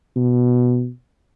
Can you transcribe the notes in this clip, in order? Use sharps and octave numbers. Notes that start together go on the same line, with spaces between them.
B2